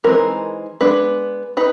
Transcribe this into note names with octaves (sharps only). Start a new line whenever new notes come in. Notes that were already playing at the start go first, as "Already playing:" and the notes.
E3 G#3 C4 D#4 A#4
G#3 B3 D4 B4
D#4 B4